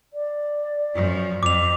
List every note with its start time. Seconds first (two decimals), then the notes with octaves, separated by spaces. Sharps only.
0.13 D5
0.95 F#2 F3
1.43 F2 D6 F7